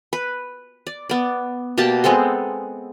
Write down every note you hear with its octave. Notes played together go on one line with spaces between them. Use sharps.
B4
D5
B3 D5
B2 A#3 G4 A5
G#3 B3 C4 A4